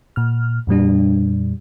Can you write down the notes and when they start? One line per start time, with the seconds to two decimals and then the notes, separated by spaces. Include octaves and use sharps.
0.16 A#2 F6
0.67 F2 A#2 G3 D4